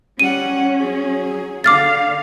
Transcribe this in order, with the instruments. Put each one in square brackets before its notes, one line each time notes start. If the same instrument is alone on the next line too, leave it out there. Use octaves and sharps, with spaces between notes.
[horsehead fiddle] G3 F#5 [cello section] C#4 [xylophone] D#7
[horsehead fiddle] F#3 G#4
[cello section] D3 F5 [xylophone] D6 F6 A6